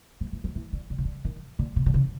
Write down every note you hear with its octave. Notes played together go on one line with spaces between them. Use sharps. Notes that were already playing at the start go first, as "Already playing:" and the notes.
F3
E3
F3
E3
D3
D3
C#3
D3
D#3
D3
C#3
D3
C#3